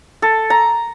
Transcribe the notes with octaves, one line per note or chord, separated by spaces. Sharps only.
A4
A#5